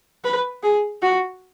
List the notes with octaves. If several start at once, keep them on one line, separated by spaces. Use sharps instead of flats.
B4
G#4
F#4